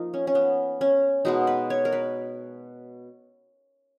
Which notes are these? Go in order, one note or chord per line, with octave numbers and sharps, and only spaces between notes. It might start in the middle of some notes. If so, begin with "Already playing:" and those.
Already playing: F3 A#3 D#4 F4
C#4
C#4
B3
C#4
B2 G#3 B3 D#4
B4
C#5
A#4
B4